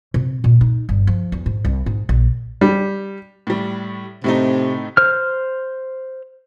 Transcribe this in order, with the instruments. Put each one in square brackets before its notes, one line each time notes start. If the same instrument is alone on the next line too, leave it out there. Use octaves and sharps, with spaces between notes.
[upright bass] C3
A#2
D#4
G1
F3
E2
G#2
C2
G#2
A#1
[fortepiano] G3
[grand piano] A2 G3
[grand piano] A2 A3 D#4 [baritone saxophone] C3
[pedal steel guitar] C5 F6